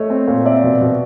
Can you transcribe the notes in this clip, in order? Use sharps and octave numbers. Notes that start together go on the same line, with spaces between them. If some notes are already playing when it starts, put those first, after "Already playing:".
Already playing: A3 C#5 D#5
C4
A#2
C4 D5 E5
B2
B2